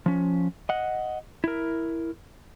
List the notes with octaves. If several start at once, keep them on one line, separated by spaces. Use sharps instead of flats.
F3 C#4
D#5 F#5
E4 A#4